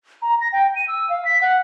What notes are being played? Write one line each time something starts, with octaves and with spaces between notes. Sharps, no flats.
A#5
A#6
G5
D#7
E6
F5
B6
F#5